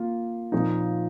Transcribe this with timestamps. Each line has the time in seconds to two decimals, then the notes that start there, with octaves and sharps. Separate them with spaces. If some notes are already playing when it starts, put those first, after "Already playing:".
Already playing: A#3 F4
0.52 A#2 F3 A#3 D#4